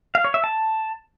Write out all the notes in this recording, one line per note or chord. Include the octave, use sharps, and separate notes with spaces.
F5
C#5
E5
A5